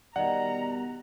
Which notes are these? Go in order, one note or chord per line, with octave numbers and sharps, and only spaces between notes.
B2 D#3 G3 D5 D#5 F#5 A#5